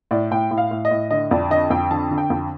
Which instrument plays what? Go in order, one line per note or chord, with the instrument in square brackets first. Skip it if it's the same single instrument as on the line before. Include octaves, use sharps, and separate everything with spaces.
[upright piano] A2 D5
A2 G5
A2
F5
A2
D#5
A2
D3 D#5
F2 D5
D3 D#5
F2 G5
D3 A5
D3
G5
F2